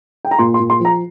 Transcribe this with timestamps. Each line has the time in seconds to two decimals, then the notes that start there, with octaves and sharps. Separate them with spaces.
0.25 G5
0.31 A#5
0.39 A#2 C6
0.54 C6
0.60 A#2
0.70 C6
0.80 F3
0.85 A#5